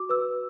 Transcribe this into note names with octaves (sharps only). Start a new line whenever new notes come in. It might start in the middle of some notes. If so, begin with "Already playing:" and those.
Already playing: F#4 D6
B4 E6